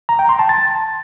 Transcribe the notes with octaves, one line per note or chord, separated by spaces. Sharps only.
A#5
G5
C6
A5
A6